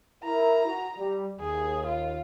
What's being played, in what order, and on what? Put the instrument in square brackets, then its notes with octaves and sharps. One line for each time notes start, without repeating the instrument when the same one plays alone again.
[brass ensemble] E4 A#4 [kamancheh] A#5
[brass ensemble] F#4
G3
[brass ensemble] D#2 [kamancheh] G#4
[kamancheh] F4